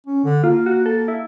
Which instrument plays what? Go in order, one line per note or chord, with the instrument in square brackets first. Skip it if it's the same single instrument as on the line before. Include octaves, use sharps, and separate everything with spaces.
[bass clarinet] C#4
D3
[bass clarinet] A#3 [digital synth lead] F4
[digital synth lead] F#4
A4
E4